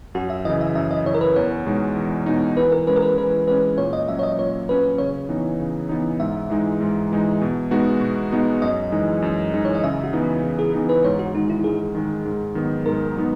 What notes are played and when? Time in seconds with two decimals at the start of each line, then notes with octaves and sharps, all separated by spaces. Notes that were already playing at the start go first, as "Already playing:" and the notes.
0.15 F#2 F#4
0.30 E5
0.45 C#3 E3 D#5
0.61 E5
0.75 F#2 E5
0.91 D#5
1.05 C#3 E3 C#5
1.15 A#4
1.21 B4
1.36 E2 C#5
1.66 B2 G#3 D#4
1.96 E2
2.26 B2 G#3 D#4
2.57 E3 B4
2.72 A#4
2.87 G#3 C#4 B4
2.96 A#4
3.02 B4
3.18 E3 B4
3.47 G#3 C#4 B4
3.77 A#2 C#5
3.93 D#5
4.08 F#3 C#4 E5
4.19 C#5
4.23 D#5
4.38 A#2 C#5
4.69 F#3 C#4 B4
4.98 C#3 C#5
5.29 E3 B3 D#4
5.60 C#3
5.89 E3 B3 D#4
6.20 G#2 E5
6.50 E3 G#3 D#4
6.81 G#2
7.11 E3 G#3 D#4
7.41 B2
7.71 G#3 B3 D#4 F#4
8.01 B2
8.32 G#3 B3 D#4 F#4
8.62 F#2 D#5
8.92 E3 G#3 D#4
9.22 F#2
9.53 E3 G#3 D#4
9.65 C#5
9.75 D#5
9.84 C#3 E5
10.03 F#4
10.13 E3 B3 D#4
10.24 E4
10.43 C#3
10.59 G#4
10.73 E3 B3 D#4
10.89 B4
11.04 G#2 C#5
11.19 F#4
11.34 D#3 G#3 D#4
11.50 E4
11.64 G#2 G#4
11.95 D#3 G#3
12.25 G#2
12.55 D#3 F#3 B3 D#4
12.86 G#2 A#4
13.16 D#3 F#3 B3 D#4